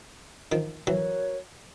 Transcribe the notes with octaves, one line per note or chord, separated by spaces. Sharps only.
D#3 F3
E3 F#3 F#4 A#4 C#5